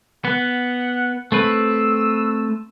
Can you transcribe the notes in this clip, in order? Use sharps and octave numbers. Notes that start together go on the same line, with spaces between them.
B3 F#5
A3 C4 B4 E6